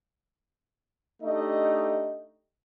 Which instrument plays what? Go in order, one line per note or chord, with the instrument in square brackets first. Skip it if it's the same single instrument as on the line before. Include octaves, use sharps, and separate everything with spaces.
[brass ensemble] A3 D4 D#4 G4 D#5